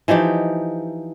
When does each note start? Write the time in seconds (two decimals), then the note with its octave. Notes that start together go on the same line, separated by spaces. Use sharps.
0.08 E3 F3 D#4 G4